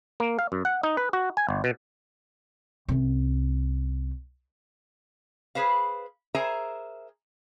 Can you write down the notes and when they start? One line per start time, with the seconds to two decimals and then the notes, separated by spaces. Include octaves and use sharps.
0.20 A#3
0.39 F5
0.52 F#2
0.65 F#5
0.83 D#4
0.97 B4
1.13 F#4
1.37 G#5
1.49 G1
1.64 B2
2.89 C2 C#4
5.55 G#4 B4 C5 F5
6.35 G#4 A#4 C5 E5 G#5 A#5